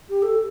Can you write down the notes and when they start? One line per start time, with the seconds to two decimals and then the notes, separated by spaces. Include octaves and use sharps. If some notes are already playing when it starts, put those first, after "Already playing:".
0.09 G4
0.22 A4